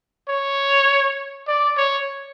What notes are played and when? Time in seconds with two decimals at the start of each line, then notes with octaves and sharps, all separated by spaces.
0.29 C#5
1.48 D5
1.77 C#5